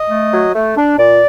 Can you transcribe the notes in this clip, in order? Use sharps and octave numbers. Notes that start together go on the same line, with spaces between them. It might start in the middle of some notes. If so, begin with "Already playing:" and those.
Already playing: D#5
A3
F#3
A3
D4
A#2 D5